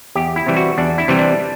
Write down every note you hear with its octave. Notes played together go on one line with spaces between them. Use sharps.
E2 G4
E4
C3 E3 G3
F#4
E2 D4
E4
C3 E3 G3
D4